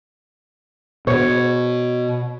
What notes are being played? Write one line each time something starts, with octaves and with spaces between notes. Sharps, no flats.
B2 C#5